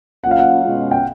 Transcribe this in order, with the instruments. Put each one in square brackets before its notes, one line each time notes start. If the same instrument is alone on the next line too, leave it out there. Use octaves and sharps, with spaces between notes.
[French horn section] F#3 A#3 C#4 F4 [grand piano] F#5
[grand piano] F5
F#5
[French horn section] B2 G#3 C#4 F4
[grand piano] G5